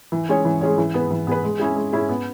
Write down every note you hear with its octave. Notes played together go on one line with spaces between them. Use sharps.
E3
G#3 C#4 G#4 C#5
E3
G#3 C#4 G#4 C#5
E3
B3 G#4 B4
E3
B3 G#4 B4
G#3
C#4 E4 G#4
G#3
C#4 E4 G#4
B3